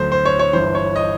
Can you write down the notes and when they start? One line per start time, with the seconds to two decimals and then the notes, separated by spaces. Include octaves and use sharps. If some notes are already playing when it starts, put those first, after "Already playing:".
Already playing: D2 D3 F#3 C5
0.12 C5
0.25 C#5
0.39 C#5
0.53 G1 G2 E3 C5
0.75 C#5
0.96 D#5